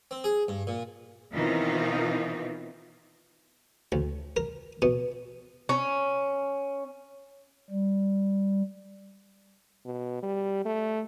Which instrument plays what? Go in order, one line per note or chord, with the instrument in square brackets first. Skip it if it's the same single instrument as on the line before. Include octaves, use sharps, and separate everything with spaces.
[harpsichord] C4
G#4
G2
A#2
[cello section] B2 D#3 E3 C4 D#4 F4
[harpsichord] D2
A#4
B2
[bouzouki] C#4
[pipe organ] G3
[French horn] B2
G3
A3